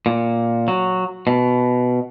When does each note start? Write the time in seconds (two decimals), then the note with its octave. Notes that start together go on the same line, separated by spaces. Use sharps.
0.06 A#2
0.68 F#3
1.27 B2